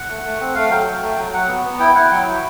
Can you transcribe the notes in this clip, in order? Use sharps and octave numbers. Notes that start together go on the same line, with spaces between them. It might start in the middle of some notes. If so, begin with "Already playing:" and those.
Already playing: F#5
A3
A3
C4
A3 F5
F#3 G5
F#3
A3
F#3
F#3 F#5
B3
B3
E4 G5
E4 F#5
F#3 G5
E4